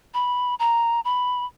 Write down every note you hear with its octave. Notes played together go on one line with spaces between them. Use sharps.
B5
A#5
B5